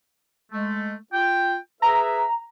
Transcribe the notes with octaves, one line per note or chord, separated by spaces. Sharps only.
G#3 A3
F4 G5
G#4 B4 E5 A#5